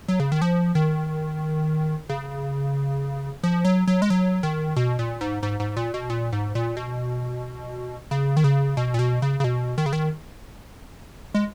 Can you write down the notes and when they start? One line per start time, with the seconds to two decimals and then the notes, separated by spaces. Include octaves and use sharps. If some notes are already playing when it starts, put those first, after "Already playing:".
0.08 F#3
0.20 C#3
0.32 D#3
0.42 F3
0.75 D#3
2.09 C#3
3.43 F3
3.65 F#3
3.87 F#3
4.02 G#3
4.10 F#3
4.43 D#3
4.76 B2
4.99 A#2
5.21 G#2
5.43 G#2
5.60 G#2
5.77 A#2
5.94 B2
6.10 A#2
6.33 G#2
6.55 A#2
6.77 B2
8.11 C#3
8.37 D#3
8.44 C#3
8.77 B2
8.94 A#2
8.99 B2
9.22 C#3
9.40 C#3
9.44 B2
9.78 D#3
9.86 C#3
9.93 D#3
11.34 G#3